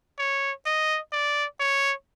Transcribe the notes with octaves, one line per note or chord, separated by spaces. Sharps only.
C#5
D#5
D5
C#5